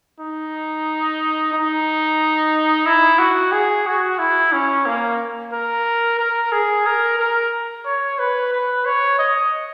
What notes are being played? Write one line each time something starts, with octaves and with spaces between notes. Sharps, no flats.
D#4
D#4
E4
F#4
G#4
F#4
E4
C#4
A#3
A#4
A#4
G#4
A#4
A#4
C#5
B4
B4
C#5
D#5